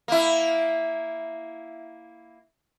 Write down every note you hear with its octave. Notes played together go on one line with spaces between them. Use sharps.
A#3 E4